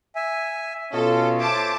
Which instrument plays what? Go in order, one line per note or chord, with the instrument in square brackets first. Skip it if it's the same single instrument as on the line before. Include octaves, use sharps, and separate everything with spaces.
[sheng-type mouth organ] E5 G#5
[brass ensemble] B2 C#4 F4 [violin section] A4 [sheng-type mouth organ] D#5
[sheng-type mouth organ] C5 C#5 E5 [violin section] A5 D6